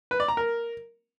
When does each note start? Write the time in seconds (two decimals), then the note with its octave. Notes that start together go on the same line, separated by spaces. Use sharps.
0.11 B4
0.20 D5
0.28 A#5
0.37 A#4